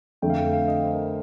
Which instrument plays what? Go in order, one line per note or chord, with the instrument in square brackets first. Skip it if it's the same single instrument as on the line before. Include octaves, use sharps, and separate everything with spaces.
[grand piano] F2 D3 A3 [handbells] G5
[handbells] F5
G5
F5
D#5
C5
A#4